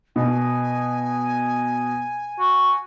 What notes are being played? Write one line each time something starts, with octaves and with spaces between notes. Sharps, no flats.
B2 G#5
F#4